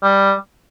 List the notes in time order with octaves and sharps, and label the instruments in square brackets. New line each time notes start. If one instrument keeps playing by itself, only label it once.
[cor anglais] G3